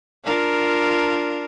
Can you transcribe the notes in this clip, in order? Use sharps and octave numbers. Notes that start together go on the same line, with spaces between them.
D4 F4 A#4